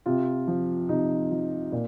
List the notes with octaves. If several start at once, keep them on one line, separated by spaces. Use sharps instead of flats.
C3 F4
F3
C3 D#4
F3
A#2